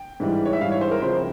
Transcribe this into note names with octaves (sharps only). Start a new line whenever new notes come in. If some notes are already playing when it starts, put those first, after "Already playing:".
Already playing: G5
G#2 E3 G3
C#5
E5
G#2 E3 G3 F5
C#5
C5
A#4
C#2 C#3 F3 C4 C5